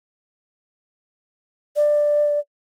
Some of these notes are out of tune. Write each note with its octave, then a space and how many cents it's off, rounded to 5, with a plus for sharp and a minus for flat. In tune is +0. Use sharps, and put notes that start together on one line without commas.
D5 +10